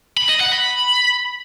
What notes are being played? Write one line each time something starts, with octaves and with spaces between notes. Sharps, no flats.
B5
D#5
F#5
B5